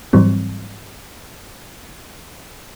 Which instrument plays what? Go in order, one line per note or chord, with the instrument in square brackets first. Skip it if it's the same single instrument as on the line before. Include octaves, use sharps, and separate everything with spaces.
[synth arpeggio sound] G#2 E3 F#3 G3 C4